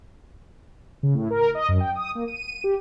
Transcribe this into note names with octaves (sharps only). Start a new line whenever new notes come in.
C#3
A2
A#4
D#5
F#2
G5
D#6
A#3
D#7
G4